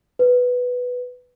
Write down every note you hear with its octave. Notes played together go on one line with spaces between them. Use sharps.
B4